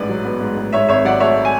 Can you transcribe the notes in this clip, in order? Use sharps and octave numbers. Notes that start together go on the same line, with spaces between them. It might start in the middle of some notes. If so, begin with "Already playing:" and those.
Already playing: A1 G#2 B4 D5
F#3
B3
G#2
A1
G#2 C#5 E5
G#1 C#5 E5
F#3 D5 F#5
A3 C#5 E5
G#5